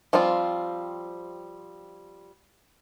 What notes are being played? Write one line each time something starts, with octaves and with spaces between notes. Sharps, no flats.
F3 G3 C4 F4